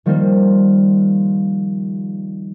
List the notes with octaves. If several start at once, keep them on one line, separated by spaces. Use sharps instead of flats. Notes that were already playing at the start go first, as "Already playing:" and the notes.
D#3 F3 G3 A#3 D#4 C5